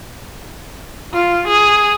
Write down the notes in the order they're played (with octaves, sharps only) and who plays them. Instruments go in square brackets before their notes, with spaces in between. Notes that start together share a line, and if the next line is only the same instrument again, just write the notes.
[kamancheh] F4
G#4